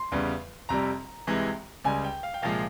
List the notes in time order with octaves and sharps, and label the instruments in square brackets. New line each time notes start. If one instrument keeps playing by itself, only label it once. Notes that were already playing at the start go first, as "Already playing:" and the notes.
Already playing: [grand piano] C6
E2 C#3 G3
F2 C3 G3 A#5
C2 C3 E3 G#3
C#2 C#3 G3 G#5
G5
F5
G5
C2 A#2 F3 G#3 F5